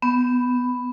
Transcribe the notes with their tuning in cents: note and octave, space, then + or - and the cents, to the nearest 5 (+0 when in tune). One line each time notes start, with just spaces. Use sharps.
B3 +5